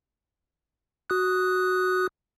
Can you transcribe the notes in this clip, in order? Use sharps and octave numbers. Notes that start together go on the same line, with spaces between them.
F#4 D#6 F#6